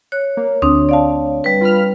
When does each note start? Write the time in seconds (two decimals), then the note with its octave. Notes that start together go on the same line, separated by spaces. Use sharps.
0.12 C#5 F#6
0.37 A#3
0.62 D2 C4 D4 D#6
0.89 D5 F5 A5
1.44 G3 B4
1.61 F4 B5 F6